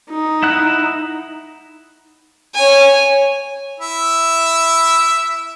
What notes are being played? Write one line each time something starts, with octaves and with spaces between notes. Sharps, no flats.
D#4
E4 F#5 F#6
C#5 G#5
E4 E5